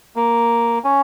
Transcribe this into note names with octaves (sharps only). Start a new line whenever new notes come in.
A#3
C#4